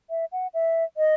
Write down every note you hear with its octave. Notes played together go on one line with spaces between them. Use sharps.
E5
F#5
E5
D#5